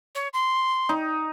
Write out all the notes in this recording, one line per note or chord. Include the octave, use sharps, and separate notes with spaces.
C#5
C6
D#4